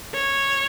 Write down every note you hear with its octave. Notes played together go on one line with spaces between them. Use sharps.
C#5